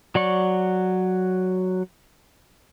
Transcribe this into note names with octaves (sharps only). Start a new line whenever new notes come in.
F#3 D5 C#6